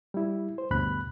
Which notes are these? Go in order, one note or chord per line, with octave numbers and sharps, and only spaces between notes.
G3 E4
C5
D2 G2 B2 B5 F#6